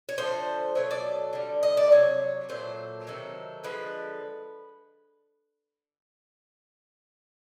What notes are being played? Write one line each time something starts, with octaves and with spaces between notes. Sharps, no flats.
C#5
D3 F3 A3 C5
B2 F#3 A3 C#5
D5
D3 G3
D#5
D5
C3 D#3 F#3 C#5
A#2 F#3 A3 C5
C3 D#3 F#3 A3
D3 F3 G#3 B4